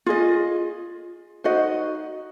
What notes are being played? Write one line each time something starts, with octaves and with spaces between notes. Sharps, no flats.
F4 G#4 D#5
D#4 F#4 C5 D#5